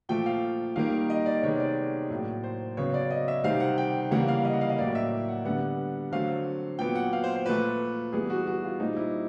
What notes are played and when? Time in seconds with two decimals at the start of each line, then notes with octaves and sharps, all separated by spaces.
0.09 A#2 F3 A3 G5
0.26 F5
0.76 D#3 G3 A#3 F5
1.10 D#5
1.26 D5
1.43 C3 D#3 G#3 B3 C#5
1.60 D5
2.10 A2 F#3 A#3
2.44 C5
2.77 C#3 F#3 B3 C#5
2.94 D5
3.11 D#5
3.28 E5
3.44 C3 D#3 G3 C4 F5
3.60 F#5
3.78 G5
4.11 C#3 E3 G3 A#3 F#5
4.28 F5
4.45 D#5
4.53 F#5
4.61 F5
4.70 D#5
4.78 A2 F#3 A#3 D5
4.95 E5
5.28 F#5
5.45 D3 G3 B3 F#5
6.12 D3 F#3 A3 C4 F5
6.79 A#2 F#3 B3 G5
6.95 F#5
7.13 F5
7.24 C5
7.36 C5
7.46 A#2 F3 A3 B4
8.13 E3 G3 B3 G#4
8.30 F#4
8.47 F#4
8.64 F4
8.80 A#2 G3 C4 D#4
8.97 E4